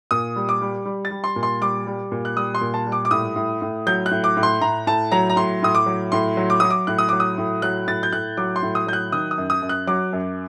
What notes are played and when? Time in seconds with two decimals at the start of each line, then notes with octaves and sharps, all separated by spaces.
0.11 A#2 D#6
0.36 G3
0.49 D6
0.62 G3
0.85 G3
1.05 A6
1.11 G3
1.24 C6
1.36 A#2
1.43 C6
1.61 G3 D6
1.87 G3
2.12 A#2
2.25 F#6
2.36 G3 D#6
2.55 C6
2.61 A#2
2.74 A5
2.86 G3
2.92 D6
3.05 D6
3.11 A2 D#6
3.36 A2
3.62 A2
3.87 F#3 G6
4.06 F#6
4.11 A2
4.24 D6
4.37 A2
4.43 C6
4.61 A2 A#5
4.87 A2 A5
5.12 F#3 A#5
5.30 A#5
5.36 A2 C6
5.62 A2 D#6
5.75 D6
5.86 F#3
6.12 A2 C6
6.37 F#3
6.50 D6
6.60 F#3 D#6
6.70 D6
6.87 A2 F#6
6.98 D#6
7.09 F#3 D6
7.20 D#6
7.38 A2
7.62 F#3 F#6
7.87 A2 A6
8.03 G6
8.13 A2 F#6
8.37 F#3 D6
8.56 C6
8.62 A2
8.75 D#6
8.87 F#3 G6
8.93 F#6
9.12 D#3 D#6
9.31 D#6
9.38 F#2
9.50 D#6
9.62 F#2
9.69 F#6
9.87 F#3 D6
10.13 F#2